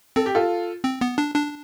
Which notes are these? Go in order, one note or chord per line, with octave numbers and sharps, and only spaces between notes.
C4 A4
G4
F4 A4
C4
B3
D4
D4